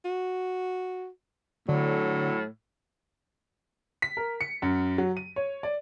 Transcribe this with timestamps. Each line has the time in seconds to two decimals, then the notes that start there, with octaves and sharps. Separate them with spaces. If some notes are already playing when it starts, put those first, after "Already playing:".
0.05 F#4
1.69 A2 D3 F#3
4.02 B6
4.17 A#4
4.41 C#7
4.62 F#2
4.98 F#3
5.17 D#7
5.36 C#5
5.63 D5